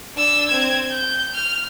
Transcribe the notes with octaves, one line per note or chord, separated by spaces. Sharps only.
D4 E6
C4 G#6
G6
F6